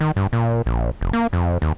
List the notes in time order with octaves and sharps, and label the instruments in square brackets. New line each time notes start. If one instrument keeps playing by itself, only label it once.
[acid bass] D#3
G2
A#2
A#1
F1
A#3
F2
D#2